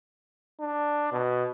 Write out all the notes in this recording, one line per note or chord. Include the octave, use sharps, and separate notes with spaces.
D4
B2